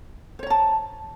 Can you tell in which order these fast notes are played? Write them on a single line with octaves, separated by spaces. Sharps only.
C5 C#5 A#5 A5